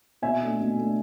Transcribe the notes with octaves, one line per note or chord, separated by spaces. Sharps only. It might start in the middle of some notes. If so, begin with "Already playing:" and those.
B2 E5 G#5
A3 D4
B2
A3 D4